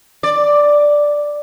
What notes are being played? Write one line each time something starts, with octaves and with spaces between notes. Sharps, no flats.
D5